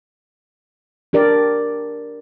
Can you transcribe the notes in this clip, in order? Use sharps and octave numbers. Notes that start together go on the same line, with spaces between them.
D4 G4 A#4 D5